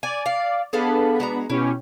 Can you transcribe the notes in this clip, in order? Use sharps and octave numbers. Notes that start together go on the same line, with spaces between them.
D5 G#5
F5
B3 D4 G#4 A4 F5 B5
G#3 F#4 A#5
B2 C#4 E4 G4